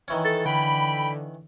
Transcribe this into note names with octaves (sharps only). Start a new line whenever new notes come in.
D#3 E3 C#4
A4 A6
D3 G5 B5